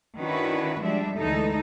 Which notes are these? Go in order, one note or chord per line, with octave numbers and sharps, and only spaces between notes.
D#3 C#4 D4 E4 F#4 B4
F3 G3 G#3 D4 E5
D2 E3 G#3 D#4 A4